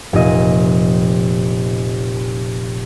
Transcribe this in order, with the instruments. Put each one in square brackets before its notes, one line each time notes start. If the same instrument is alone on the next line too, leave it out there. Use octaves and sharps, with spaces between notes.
[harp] F1 A#2 D#5